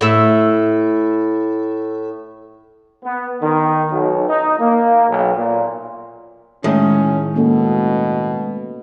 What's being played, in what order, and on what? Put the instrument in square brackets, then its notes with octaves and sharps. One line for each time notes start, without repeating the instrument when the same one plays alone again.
[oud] A2 E5
[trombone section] B3
D#3
B1
D#4
A#3
B1
A#2
[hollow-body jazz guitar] A2 D#3 [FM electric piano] G#3 [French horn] C#4
[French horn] B2 [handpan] A#3 C#4 A4